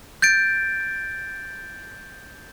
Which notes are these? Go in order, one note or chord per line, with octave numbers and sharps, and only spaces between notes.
G6 A6 D7